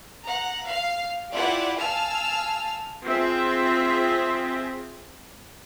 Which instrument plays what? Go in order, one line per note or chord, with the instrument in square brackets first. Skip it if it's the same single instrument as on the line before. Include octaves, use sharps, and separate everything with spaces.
[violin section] F#5 A#5
F5 C7
E4 F4 G4 D5 F#5
F5 G#5 A5 E6 F6
[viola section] C4 F4 G#4 E5